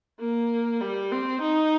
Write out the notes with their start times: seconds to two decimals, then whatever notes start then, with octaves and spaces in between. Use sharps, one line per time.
0.20 A#3
0.81 G3
1.12 C4
1.42 D#4